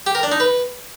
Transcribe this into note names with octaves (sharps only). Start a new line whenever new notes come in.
G4
A#4
D4
D#4
B4